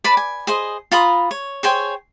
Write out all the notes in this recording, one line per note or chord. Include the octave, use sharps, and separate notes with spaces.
B4 D5 A5 B5
G#5
G#4 C5 D#5
F4 A#5 B5 D#6
C#5
G#4 C5 C#5 G5